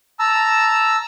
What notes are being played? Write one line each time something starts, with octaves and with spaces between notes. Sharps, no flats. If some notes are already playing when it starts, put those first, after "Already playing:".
A5 A#5 E6